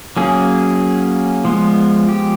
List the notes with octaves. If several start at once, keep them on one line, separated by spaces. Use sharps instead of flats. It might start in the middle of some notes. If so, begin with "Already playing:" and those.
F#3 A#3 C#4 G#4
F3 G#3 B3
G4